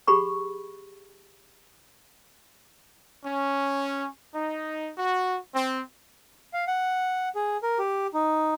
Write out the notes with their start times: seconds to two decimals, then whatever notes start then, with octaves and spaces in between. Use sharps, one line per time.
0.07 G4 G#4 B5 C#6
3.25 C#4
4.35 D#4
4.98 F#4
5.55 C4
6.54 F5
6.67 F#5
7.35 G#4
7.63 A#4
7.79 G4
8.14 D#4